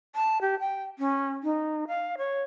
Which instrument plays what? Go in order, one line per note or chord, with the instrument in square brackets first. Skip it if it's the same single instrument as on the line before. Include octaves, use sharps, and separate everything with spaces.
[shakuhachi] A5
G4
G5
C#4
D#4
F5
C#5